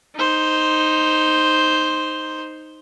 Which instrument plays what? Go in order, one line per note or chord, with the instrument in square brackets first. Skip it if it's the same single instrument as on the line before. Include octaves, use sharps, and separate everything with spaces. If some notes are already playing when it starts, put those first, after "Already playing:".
[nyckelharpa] D#4 C5